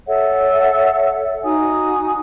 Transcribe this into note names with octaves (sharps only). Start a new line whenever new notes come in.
A4 C#5 E5 F#5
D#4 F#4 G#5 D#6